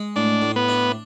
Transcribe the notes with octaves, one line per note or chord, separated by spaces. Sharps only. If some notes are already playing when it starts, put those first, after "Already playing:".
Already playing: G#3
A2 D4
A2
B3
D4